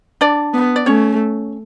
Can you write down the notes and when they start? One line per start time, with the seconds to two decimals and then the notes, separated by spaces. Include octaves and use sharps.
0.21 D4 D5
0.54 B3
0.76 D5
0.86 A3 C#4 C#5